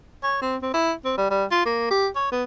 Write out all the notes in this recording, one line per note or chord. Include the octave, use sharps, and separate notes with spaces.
C#5
C4
C4
E4
C4
G3
G3
F4
A#3
G4
C#5
B3